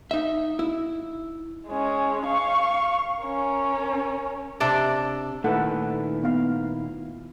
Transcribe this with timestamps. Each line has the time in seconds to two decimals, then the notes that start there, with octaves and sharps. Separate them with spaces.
0.11 D#4 E5
0.59 E4
1.68 G#3 C#4
2.26 F5 C#6
3.22 C#4 A#4
4.60 C3 D4 D5
5.44 A#2 D#3 A3 D#4 E4 A4 B4 F#5
6.23 B3 F5